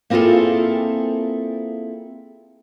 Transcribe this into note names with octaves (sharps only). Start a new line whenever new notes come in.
A#3 C4 E4 F4 G#4 A4